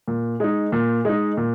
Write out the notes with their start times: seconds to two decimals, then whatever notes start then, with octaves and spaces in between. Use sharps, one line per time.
0.08 A#2
0.40 G#3 D#4
0.72 A#2
1.05 G#3 D#4
1.37 A#2